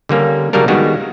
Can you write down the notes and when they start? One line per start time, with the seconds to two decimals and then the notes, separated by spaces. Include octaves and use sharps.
0.09 D3 G3 A#3 C#4
0.53 C#3 F#3 G3 A#3 D4 A#4
0.68 D#3 G3 G#3 B3 F#4